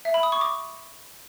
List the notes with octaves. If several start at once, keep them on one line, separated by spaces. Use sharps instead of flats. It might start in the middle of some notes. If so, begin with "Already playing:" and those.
E5
B5
D#6
C#6
D6